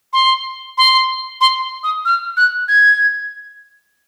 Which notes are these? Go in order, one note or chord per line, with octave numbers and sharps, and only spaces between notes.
C6
C6
C6
D#6
F6
F#6
G#6